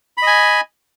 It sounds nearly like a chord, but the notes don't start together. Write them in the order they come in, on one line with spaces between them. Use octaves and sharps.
B5 D#5 G#5